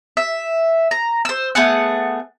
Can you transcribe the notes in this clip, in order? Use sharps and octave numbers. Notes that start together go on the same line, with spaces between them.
E5
A#5
C5 E6
A3 B3 G#4 F#5